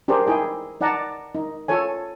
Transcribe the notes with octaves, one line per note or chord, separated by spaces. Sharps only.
D4 G4 G#4 A#4 C5
D#4 E4 G#4 G5
D#4 D5 F#5 A5 A#5
D#4
F4 A4 C#5 G#5